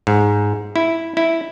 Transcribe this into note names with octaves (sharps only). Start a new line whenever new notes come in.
G#2
E4
E4